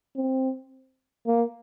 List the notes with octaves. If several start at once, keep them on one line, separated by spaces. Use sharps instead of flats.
C4
A#3